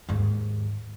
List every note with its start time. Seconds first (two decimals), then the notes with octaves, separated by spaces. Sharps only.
0.09 D#2 G#2